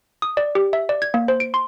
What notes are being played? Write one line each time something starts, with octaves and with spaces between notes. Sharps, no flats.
D#6
D5
G4
E5
D5
G#6
A#3
C5
D7
C6